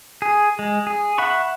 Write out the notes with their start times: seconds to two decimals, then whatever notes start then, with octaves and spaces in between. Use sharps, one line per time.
0.22 G#4
0.59 G#3
0.87 G#4
1.18 E5 F#5 B5 C#6